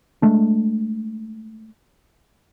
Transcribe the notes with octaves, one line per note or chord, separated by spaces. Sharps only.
G#3 A3 D4